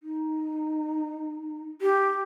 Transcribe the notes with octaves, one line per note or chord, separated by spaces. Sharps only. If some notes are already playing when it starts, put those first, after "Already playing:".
D#4
G4